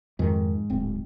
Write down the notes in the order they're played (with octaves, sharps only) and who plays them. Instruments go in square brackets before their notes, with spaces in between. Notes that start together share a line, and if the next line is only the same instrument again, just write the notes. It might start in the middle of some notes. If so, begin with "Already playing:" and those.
[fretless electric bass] F2 D#3 [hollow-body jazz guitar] G#2
[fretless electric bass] D1 C4